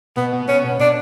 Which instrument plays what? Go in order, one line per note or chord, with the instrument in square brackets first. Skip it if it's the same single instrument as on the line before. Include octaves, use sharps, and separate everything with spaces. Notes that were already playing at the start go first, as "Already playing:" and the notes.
[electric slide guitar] B2 [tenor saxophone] B3
[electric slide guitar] B3
[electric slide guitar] B3 [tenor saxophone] C#4
[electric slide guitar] B2
[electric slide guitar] B2 [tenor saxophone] D4